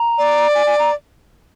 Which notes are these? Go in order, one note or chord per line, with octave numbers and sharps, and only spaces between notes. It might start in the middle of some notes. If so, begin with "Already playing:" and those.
Already playing: A#5
D5
G#5
G#5
A#5